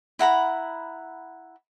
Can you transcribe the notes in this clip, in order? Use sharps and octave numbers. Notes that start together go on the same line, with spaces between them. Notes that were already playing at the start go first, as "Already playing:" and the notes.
E4 F#5 A#5 B5